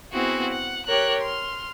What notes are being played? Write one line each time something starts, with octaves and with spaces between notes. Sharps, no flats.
B3 C4 E4 F#4 G#4
F#5
G4 A#4 C#5 F#6
C6 F6